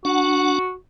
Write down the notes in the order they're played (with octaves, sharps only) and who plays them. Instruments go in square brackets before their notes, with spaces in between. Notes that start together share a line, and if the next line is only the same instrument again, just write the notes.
[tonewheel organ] D4 F#5 [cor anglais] F#4